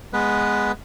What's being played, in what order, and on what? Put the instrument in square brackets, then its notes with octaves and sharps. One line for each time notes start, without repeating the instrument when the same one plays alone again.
[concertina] G#3 B3 B4